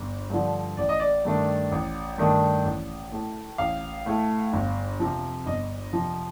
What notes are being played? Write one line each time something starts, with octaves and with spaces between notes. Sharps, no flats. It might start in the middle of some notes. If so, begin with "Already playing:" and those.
Already playing: G1
G2 D3 F3
A1 D5
D#5
D5
G2 D#3 A3 D4
A1
G2 D#3 A3 D4
A1
A2 A3
A1 F5
A2 A3
G1
F2 C3 F3
G1 D#5
F2 C3 F3